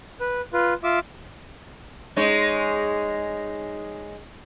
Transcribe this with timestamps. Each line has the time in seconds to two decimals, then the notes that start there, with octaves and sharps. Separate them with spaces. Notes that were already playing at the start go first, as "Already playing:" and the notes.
0.20 B4
0.53 F4 B4
0.84 F4 E5 D6
2.16 G#3 D#4 C#5